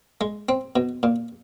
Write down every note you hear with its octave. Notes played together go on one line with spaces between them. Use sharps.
G#3
C4
B2
A#2